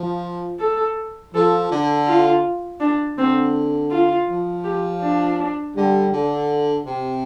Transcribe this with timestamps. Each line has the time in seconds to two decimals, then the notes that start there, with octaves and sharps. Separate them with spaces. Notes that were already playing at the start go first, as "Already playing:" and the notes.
Already playing: F3
0.60 A4
1.34 F3 A4
1.71 D3
2.07 F4
2.80 D4
3.18 D3 C4
3.91 F4
4.28 F3
4.64 G4
5.02 D4
5.75 D3 G3
6.11 D3
6.86 C3